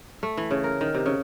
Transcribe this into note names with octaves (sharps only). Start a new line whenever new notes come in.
A3
E3
C#3
A#4
D#3
C3
C#3